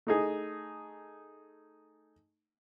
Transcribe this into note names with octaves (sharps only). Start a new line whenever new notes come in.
A3 D#4 G#4